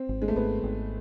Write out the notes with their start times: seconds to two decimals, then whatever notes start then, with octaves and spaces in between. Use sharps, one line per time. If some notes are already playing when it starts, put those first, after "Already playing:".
Already playing: C4
0.09 G#1
0.22 G#3
0.28 A3
0.36 G#1 B3
0.64 G#1